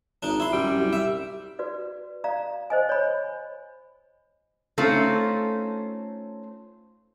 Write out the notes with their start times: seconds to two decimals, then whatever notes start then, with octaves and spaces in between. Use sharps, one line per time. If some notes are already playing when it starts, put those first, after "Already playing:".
0.23 G#1 D4 D#4
0.40 E4 C6
0.52 F#2 G3
0.80 C2
0.93 E5
1.59 F#4 B4 D5
2.24 D5 F5 A#5
2.70 C5 D#5 G#5
2.89 C#5 B5
4.78 A3 C4 C#4 D#4 F4 A4